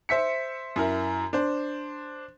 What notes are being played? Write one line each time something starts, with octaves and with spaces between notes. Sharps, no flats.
C5 E5 B6 C#7
F#2 E4 A#4
D4 C5